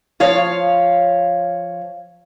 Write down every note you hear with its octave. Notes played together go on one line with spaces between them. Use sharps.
F3 C#5 F5